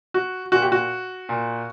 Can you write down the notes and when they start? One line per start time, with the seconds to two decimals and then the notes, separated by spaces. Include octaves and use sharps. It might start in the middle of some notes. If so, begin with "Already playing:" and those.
0.14 F#4
0.52 A#2 F#4
0.62 G4
0.72 F#4
1.29 A#2